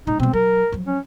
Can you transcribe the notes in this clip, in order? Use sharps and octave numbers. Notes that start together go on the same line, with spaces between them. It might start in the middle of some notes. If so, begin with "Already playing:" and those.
A#2 G#3 D#4
B2 G3 C4
F#3 A#4
F3 F#3
C#4